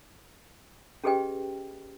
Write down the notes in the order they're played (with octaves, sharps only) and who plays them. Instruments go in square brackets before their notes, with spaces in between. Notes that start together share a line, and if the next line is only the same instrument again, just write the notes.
[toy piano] C#4 G4 G#4 B4 D#5 G5